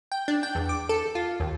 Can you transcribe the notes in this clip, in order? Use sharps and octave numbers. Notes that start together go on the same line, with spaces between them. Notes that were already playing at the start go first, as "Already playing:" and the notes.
G5
D4
G5
E2
D6
A4
F4
D#2